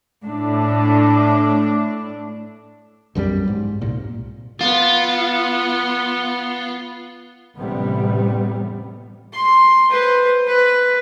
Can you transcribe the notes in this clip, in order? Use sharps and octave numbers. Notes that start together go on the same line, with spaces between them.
A2 D4
B1 F#2 F#3 G3
G#2
C2 A#2
B3 F4
A1 F2 C3 G3 B3
C6
B4 C5
B4